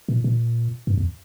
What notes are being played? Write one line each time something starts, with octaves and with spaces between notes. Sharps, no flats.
A#2
A#2
G2
E2